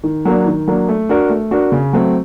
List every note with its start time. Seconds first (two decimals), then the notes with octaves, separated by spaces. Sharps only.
0.04 D#3
0.25 F#3 A#3 D4
0.46 D#3
0.68 F#3 A#3 D4
0.89 A3
1.09 D4 F#4 A#4
1.30 A3
1.51 D4 F#4 A#4
1.72 C#3
1.93 F#3 A3 C4